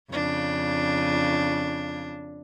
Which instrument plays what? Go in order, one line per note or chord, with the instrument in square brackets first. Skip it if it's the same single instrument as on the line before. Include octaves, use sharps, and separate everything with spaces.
[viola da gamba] F2 C#3 D4